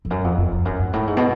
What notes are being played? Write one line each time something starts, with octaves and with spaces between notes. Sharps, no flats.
F2
F#2
F2
F2
F2
F#2
G#2
A2
G#2
B2